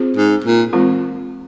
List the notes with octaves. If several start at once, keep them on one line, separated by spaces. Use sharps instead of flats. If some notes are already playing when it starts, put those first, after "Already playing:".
Already playing: C4 F4 G#4 C5
G#2
A#2
E3 G#3 C4 F4 A#4